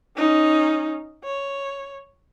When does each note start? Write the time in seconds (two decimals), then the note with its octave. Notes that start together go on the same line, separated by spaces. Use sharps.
0.17 C#4 D#4
1.24 C#5